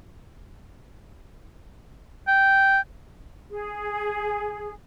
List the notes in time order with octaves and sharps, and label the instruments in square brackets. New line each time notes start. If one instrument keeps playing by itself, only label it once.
[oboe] G5
[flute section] G#4